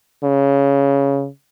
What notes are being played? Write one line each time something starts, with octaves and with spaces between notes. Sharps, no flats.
C#3